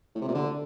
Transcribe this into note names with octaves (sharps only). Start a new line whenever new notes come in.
A2
C3
A#2
D3